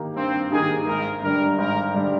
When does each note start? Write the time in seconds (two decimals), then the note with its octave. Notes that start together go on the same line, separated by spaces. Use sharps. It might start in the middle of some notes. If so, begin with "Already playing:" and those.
Already playing: D#3 A#3 D#4 G4
0.16 G2 C4
0.51 D#3 A#3 D#4 G4 G#4
0.87 G#1 A#4
1.22 G2 D3 G3 A#4
1.58 G#1 A#4
1.94 G2 D3 G3